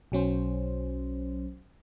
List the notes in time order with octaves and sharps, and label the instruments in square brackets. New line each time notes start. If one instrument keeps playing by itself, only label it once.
[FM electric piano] B1 F#3 C#4 C5